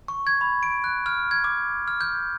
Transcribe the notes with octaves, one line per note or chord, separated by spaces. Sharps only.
C#6
G#6
B5
D7
F#6
F6
G#6
D6
F6
G6